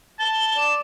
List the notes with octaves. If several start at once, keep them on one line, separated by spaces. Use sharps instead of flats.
A5 G7
D5 E7